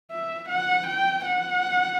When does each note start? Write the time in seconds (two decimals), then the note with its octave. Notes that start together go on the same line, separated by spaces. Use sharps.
0.11 E5
0.49 F#5
0.87 G5
1.26 F#5